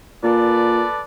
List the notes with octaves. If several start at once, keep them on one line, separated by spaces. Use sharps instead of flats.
A#2 A4 B4 D5